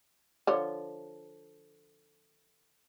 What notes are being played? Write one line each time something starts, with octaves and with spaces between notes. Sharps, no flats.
D3 F3 C#5